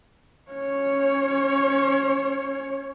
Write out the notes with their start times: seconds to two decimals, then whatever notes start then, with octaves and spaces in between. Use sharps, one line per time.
0.51 C#4 C#5